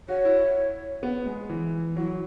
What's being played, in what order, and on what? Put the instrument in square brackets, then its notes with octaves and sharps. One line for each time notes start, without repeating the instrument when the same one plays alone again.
[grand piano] F#4 [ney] C#5
[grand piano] E4
B3
G#3
E3
[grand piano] F#3 [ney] E4